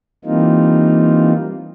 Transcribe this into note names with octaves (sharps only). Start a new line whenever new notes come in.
E3 G3 A#3 C4 D#4 F4